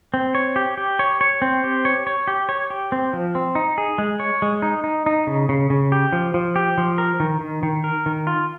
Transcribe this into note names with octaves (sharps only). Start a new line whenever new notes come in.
C4
C#5
G4
G4
C#5
C#5
C4
G4
C#5
C#5
G4
C#5
G4
C4
F3
C4
D#4
G#4
G#3
C#5
G#3
D#4
D#4
D#4
C#3
C#3
C#3
G4
F3
F3
G4
F3
A#4
D#3
D#3
D#3
A#4
D#3
F4